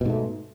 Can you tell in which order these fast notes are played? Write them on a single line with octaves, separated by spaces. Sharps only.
B2 G#2 A3